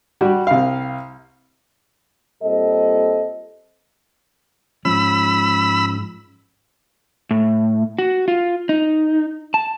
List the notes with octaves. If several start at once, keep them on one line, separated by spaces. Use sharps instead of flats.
G3 F#4 G4
C2 F5
A#2 G3 C4 A4 D#5
G#2 F3 G#3 C#4 B5 E6
A2
F#4
F4
D#4
A5